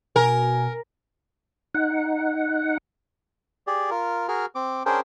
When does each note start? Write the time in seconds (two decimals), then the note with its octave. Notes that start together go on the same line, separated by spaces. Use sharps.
0.16 B2 A#4 G#5
1.75 D#4 F#5
3.67 G4 G#4 D5
3.90 F4 A#4
4.28 F#4 G#4 A#4 F6
4.55 C4 D6
4.86 C#4 D4 G#4 A#4 C5 G5